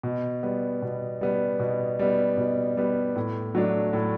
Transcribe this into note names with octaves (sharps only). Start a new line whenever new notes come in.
B2
G3 B3
B2
G3 B3
B2
G3 B3
B2
G3 B3
A2
F#3 A3 D4
A2